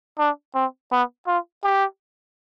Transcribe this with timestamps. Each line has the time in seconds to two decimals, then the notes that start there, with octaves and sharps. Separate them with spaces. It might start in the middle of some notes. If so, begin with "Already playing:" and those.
0.19 D4
0.55 C4
0.91 B3
1.27 F4
1.63 G4